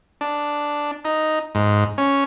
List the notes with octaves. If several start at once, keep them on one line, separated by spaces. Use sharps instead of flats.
D4
D#4
G#2
C#4